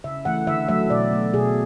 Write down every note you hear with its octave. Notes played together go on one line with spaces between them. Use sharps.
C#3 E5
E3 A3 F#5
D3 E5
F#3 A3 E5
B2 D5
A3
B2 G#4